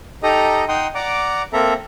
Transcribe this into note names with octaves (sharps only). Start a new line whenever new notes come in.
D#4 G4 A4 D#5 A#5
D#4 F#5 G5 C6 D#6
D5 F#5 A#5 D6
A#3 C4 A4 E5 A#5